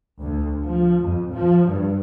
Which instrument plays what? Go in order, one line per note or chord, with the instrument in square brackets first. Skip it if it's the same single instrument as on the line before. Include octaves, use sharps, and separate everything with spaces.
[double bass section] D2
F3
F2
F3
G2